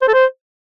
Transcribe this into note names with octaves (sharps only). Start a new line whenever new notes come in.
C5
A4
C5